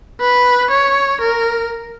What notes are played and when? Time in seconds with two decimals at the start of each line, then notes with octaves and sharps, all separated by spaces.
0.20 B4
0.70 C#5
1.21 A#4